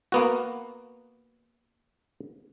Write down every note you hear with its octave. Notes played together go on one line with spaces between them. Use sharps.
A#3 B3 F#4